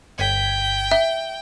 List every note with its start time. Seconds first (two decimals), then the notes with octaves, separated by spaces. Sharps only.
0.19 G1 G5 G#6 B6
0.91 E5